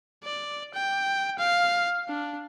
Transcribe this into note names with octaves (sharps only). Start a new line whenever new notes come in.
D5
G5
F5
D4